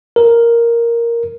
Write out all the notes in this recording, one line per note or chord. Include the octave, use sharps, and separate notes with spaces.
A#4